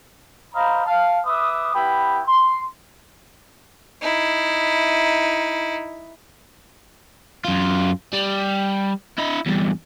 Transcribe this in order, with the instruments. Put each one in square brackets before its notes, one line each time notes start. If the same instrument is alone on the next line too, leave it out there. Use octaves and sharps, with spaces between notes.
[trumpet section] C5 D#5 F5 A#5 B5
F5 A5
B4 E5 D6 D#6
B3 E4 G4 B4 G5 B5
C6
[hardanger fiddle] D#4 E4
[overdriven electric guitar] F#2 F4
G3
E4 D#5
E2 G2